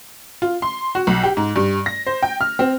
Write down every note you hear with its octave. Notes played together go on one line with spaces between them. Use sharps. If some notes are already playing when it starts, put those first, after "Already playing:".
F4
C6
F#4
B1
G4
G#2
G2
A#6
C5
G5
F6
C4